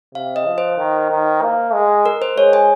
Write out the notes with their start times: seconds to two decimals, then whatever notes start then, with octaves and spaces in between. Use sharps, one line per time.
0.15 C3 F5
0.36 D#5
0.46 F3
0.58 C5
0.78 D#3
1.11 D#3
1.42 A#3
1.74 G#3
2.06 A#4
2.22 C5
2.37 G#3 C#5
2.53 G#5